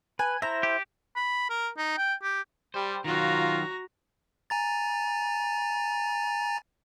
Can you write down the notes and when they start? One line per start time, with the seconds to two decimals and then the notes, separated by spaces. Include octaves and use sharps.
0.19 B4 G#5
0.42 E4 C5 E5 A#5
0.63 G4
1.16 B5
1.50 A#4
1.77 D#4
1.98 G5
2.22 G4
2.74 G3 C5
3.04 D#3 F#3 F4 F#4 A#5
4.50 G#5 A#5 A6